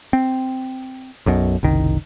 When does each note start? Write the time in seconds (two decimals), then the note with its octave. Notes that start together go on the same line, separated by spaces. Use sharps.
0.13 C4
1.26 B1 F#2 B2
1.63 F#1 C2 D#3